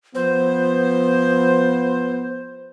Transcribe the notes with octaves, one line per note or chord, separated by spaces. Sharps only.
F3 B3 C5